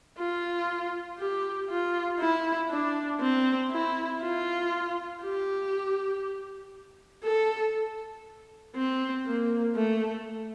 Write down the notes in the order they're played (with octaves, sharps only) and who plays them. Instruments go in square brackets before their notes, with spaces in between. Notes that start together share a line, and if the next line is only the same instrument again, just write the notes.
[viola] F4
G4
F4
E4
D4
C4
E4
F4
G4
A4
C4
A#3
A3